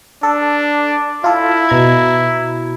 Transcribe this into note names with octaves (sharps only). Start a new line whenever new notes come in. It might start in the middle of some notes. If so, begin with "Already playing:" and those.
D4 A4
E4 F4 A4
B2 A#5 G#6